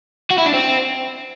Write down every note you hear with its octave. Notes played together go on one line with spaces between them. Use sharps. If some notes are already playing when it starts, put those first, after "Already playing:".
F#4
E4
D4
C4